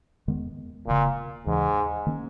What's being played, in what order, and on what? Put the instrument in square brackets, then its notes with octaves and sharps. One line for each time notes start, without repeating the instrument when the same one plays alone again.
[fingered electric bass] E2 D#3 G#3 B3
[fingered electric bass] E1 E2 C#3 [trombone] A#2
[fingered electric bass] D#2 C#3 E3 [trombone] G#2
[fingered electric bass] D#3 A#3 C#4